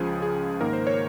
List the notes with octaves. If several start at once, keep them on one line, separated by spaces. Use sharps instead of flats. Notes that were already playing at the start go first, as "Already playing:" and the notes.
Already playing: C#2 C#3 F3 G#4
G#4
G#2 D#3 A#3 A#4
C5
C#5